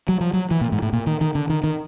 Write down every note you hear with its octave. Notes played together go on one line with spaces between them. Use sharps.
F#3
F3
F#3
E3
A#2
G#2
A2
A#2
D#3
D#3
D3
D#3
D#3